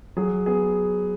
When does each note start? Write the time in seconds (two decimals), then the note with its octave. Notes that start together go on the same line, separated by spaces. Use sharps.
0.17 F#3 G#4
0.46 B3 G#4